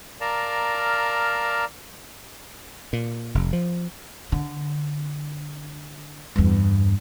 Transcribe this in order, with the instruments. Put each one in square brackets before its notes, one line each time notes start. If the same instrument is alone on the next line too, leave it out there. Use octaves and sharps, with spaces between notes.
[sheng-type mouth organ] A#4 D5 F5 A5 A#5
[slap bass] A#2
F1
F3
[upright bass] D3
E2 G2